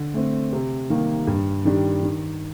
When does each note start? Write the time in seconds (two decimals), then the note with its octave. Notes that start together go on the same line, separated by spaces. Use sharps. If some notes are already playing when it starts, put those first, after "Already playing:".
Already playing: D3
0.14 A3 C4
0.53 C3
0.90 D#3 G3 A#3
1.27 G2
1.65 D#3 G3 D4 G4
2.03 D#3